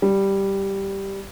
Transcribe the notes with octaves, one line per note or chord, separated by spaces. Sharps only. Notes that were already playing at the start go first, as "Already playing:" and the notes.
G3